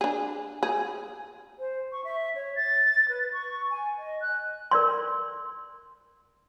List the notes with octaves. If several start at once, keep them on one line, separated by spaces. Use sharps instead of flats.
D4 G#4
G#4
C5
C#6
E5
C#5
A6
B4
C#6
G#5
D#5
F#6
A#4 D5 C6